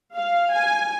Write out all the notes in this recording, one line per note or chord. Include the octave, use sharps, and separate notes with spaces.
F5
G#5